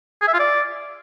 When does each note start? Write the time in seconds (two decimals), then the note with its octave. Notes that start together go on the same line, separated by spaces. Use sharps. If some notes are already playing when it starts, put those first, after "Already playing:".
0.22 G#4
0.28 E5
0.34 F4
0.39 D5